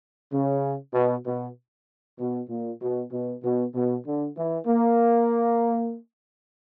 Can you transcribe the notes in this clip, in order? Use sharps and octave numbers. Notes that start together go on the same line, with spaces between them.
C#3
B2
B2
B2
A#2
B2
B2
B2
B2
D3
E3
A#3